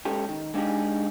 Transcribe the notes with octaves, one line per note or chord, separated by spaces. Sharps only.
G#3 C#4 G4 A4
D#3
G#3 D4 D#4 G4 G#4